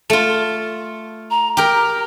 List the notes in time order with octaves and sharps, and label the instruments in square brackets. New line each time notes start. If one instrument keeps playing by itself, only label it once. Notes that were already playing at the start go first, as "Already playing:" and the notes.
[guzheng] A3 F4
[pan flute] A#5
[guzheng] G4 A#4 [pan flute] A#5